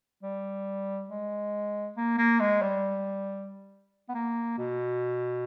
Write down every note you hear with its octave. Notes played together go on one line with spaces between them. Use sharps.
G3
G#3
A#3
A#3
G#3
G3
B3
A#3
B2